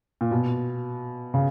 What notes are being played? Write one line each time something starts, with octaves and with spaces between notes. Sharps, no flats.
A#2
B2
C#3